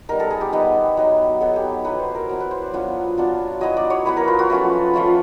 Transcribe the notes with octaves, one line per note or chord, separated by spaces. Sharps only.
G3 B3 D#4 A#4
A4
G#4
G4
G3 B3 D#4
F#3 B3 D#4
F#3 B3 D#4 A4
G4
F#3 B3 E4 B4
C5
A#4
F#3 B3 E4
B4
C5
D5
F#3 B3 D4 F4
F#3 B3 D4 F4
F#3 B3 E4 D#5
D5
C#5
F#3 B3 E4 B4
A#4
F4
F#4
F3 A3 C#4 F4 B4
F3 A3 C#4 F4